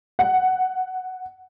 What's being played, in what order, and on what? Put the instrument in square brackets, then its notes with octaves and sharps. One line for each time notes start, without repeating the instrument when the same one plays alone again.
[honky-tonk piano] F#5